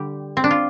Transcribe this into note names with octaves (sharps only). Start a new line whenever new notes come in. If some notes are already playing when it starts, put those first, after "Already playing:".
Already playing: D3 G3 G4
C4
D4
F4